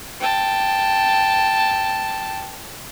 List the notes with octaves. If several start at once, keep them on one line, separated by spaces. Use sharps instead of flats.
G5 A5